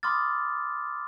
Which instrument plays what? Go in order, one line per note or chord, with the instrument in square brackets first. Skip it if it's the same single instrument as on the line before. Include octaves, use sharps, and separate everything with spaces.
[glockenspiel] B5 C6 D6 D#6 F6 A6